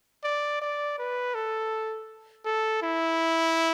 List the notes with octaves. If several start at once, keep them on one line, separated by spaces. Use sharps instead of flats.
D5
D5
B4
A4
A4
E4